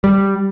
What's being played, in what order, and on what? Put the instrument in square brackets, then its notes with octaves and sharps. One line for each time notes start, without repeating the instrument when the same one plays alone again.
[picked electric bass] G3